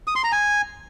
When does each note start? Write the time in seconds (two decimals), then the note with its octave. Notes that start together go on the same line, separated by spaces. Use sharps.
0.07 D#6
0.16 C6
0.24 A#5
0.32 G#5